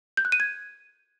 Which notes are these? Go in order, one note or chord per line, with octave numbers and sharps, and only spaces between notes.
G6
F#6
D#7
G#6